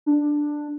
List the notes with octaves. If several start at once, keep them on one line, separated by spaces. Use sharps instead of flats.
D4